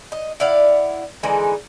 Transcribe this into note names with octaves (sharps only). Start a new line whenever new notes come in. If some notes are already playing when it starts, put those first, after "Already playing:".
D#5
E4 D5 F5 F#5
D3 E3 G#3 D#4